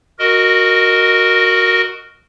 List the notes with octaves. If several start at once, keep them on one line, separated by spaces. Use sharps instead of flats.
F#4 A#4 D#5